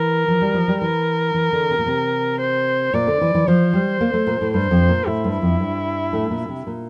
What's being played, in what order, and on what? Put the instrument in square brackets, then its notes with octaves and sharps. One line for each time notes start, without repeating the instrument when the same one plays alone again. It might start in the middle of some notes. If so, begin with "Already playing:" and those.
Already playing: [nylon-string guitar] E3 [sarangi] A#4
[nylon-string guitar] F3
G3
F3
G3
[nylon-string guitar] E3 [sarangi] A#4
[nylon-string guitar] E3
D3
C3
A#2
C3
[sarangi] C5
[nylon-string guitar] A#2 [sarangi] D5
[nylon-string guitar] D3
E3
E3
[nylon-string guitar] F3 [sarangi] C5
[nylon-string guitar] G3
A#3
A3
A#2
A2
[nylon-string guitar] G2 [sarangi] C5
[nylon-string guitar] F2
A#2
[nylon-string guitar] A2 [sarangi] E4
[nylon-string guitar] G2
F2
G2
A2
A#2
C3
A#2